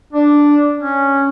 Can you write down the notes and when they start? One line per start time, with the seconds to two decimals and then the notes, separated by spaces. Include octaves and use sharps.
0.13 D4
0.80 C#4